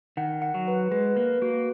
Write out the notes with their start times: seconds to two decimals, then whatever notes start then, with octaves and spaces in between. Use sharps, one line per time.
0.17 D#3 F#5
0.42 F#5
0.54 F#3
0.67 B4
0.91 G#3 B4
1.16 A#3 B4
1.42 A#3 F#4